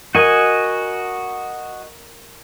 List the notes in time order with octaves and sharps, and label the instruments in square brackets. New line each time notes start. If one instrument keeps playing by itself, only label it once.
[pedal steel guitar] F#4 D#5 G#5 [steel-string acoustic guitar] A#4